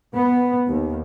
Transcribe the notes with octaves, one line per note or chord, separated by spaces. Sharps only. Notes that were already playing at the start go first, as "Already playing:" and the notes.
B3
D#2